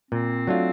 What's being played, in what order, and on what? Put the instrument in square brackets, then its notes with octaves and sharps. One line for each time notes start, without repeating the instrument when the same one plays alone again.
[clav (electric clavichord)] A#2 [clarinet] C4
[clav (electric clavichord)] F#3 A3 D4 F4